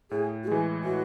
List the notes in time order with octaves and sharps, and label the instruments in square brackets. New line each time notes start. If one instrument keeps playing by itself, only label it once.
[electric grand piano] A2 [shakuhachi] G#4
[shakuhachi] F#4
[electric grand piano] E3 G#3 [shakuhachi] G#4
[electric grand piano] A2 [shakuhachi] F#4